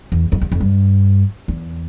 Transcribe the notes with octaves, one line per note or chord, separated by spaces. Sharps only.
E2
F2
E2
F2
G2
E2